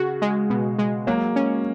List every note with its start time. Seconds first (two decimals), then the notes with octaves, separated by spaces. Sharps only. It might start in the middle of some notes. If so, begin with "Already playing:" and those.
Already playing: C#3 F#4
0.22 G#3
0.50 B2
0.78 G#3
1.07 F#3 A#3
1.36 C#4